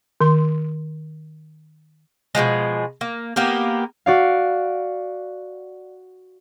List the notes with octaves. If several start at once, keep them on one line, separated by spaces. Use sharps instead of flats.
D#3 C6
B2 D3 F3 G#3
A#3
A#3 B3 G4 A#4
F#4 D5 F5